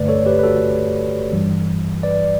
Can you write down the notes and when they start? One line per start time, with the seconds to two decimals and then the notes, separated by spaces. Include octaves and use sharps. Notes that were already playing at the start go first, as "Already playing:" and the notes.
Already playing: G2 D3 A3 B4 D5
0.08 A4 C#5
0.26 G4 B4
0.39 B4
0.43 F#4 A4
1.32 G2 E3 G3
2.03 B4 D5